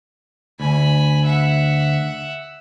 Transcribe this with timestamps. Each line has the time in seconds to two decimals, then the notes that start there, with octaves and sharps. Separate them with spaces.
0.60 D2 G#5 B5
1.25 E5 F#5